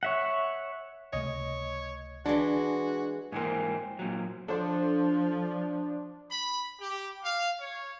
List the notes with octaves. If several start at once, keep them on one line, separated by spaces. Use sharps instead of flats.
C#5 E5 F#5
C#2 C3 A3 C#5 D#5
E3 G#3 D4 F#4 D5
G#2 E3 A#3 C5 G5 G#5
A#2 F#3
F3 D4 A4 C5
B5
G4
F5
C#5